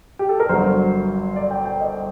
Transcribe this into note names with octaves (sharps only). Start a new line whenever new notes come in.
G4
A4
A#4
G1 G2 F#3 C5
D5
G5
G5
D#5